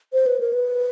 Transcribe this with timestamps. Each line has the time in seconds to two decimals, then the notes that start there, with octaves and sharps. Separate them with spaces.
0.13 C5
0.26 B4
0.40 A#4
0.53 B4